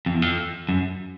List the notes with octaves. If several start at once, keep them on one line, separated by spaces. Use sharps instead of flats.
F2
E2
F2
F#2